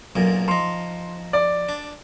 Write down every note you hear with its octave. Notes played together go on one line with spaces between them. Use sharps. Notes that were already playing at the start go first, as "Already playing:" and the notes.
B1 F#2 A#2
F3 D#4 C6
D5
D4